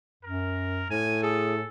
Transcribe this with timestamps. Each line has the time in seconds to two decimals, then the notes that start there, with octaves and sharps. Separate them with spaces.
0.23 F#2 A#4
0.90 A2 G#5
1.22 G#4 A4